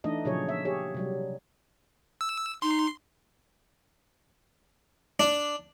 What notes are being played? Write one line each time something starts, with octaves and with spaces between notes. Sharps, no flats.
E3 A3 D4 D#4 D#5
A#2 C#3 F3 F#3 G#4 C#5
E5
G4 G#4 C#5
C3 F#3 G3
E6
D#4 C6
D4